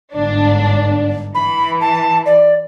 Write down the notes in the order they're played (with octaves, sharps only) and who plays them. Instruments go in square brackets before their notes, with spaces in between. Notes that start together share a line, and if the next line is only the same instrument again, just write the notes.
[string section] G1 G#2 D4
[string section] E3 [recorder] B5
[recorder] A5
D5